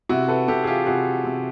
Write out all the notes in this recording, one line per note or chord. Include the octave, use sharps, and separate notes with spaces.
C3 E4 F#4
A4 B4
C3 G4 A4
G#4
F4 G4
C3 F#4 G#4
C3